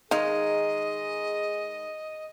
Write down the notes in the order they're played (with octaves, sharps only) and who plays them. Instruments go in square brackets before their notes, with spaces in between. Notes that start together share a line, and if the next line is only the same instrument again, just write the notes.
[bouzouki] D#3 G#3 [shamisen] D#4 F5 [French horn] G#4 [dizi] D#5